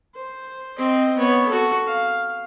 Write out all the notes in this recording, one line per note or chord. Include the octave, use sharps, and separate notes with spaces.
C5
C4 D#5
B3 C#5
F#4 A4
F5